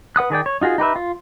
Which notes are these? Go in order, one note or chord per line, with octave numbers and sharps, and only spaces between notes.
B4 F#5 D#6 F#6
D#3 G#4 D5 G5
C#5
D#4 F4 F#4 G#4
D#4 G4 B4 E5
F4